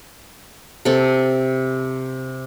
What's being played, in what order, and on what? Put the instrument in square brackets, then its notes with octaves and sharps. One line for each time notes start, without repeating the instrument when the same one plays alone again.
[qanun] C3 A4